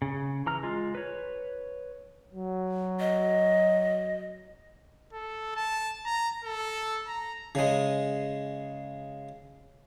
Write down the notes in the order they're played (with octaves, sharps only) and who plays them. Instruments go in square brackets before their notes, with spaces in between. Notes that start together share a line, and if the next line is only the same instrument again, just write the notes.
[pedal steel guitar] C#3
E3 A#5 F6
G#3 F4
B4 C#5
[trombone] F#3
[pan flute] D#5
[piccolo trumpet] A4
A5
A#5
A4
A#5
[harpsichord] C#3 G#3